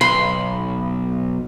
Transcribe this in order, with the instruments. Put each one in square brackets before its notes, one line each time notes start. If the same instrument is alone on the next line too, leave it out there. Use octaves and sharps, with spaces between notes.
[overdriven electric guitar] B1 [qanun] B5 C6